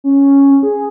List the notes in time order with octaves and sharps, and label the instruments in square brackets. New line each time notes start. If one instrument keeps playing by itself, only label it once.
[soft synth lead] C#4
G#4